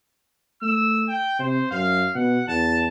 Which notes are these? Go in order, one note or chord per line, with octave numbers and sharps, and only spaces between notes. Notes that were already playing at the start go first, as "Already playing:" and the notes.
A3 E6
G5
C3 C5
F#2 F5
B2 F#5
E2 A5